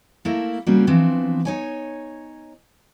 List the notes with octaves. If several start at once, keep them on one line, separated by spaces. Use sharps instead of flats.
A3 A#3 E4 A4 A#4
C#3 G3 A#3 C4 C#4 F#4
E3 F3 B3 C4 D4
D#4 C#5 G#5